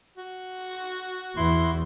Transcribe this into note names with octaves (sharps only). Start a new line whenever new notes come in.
F#4
E2 E4 C6